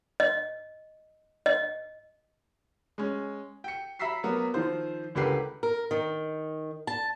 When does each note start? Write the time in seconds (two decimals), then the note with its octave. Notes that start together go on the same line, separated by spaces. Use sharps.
0.20 D#5
1.46 D#5
2.98 G#3 C#4
3.64 G5 C#7
3.99 E5 A#5 B5 E6 B6 C7
4.23 F#3 A#3 B3
4.54 D#3 F3 C5
5.15 C#2 D3 G4 A#4 B4 C7
5.63 A#4
5.91 D#3
6.87 A5